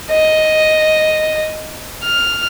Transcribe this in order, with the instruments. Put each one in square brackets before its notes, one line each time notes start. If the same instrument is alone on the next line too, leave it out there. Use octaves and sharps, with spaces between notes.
[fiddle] D#5
F6